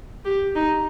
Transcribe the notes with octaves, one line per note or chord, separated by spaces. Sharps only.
G4
D#4